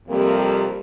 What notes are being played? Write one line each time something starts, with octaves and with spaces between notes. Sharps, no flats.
F2 C3 G3 A#3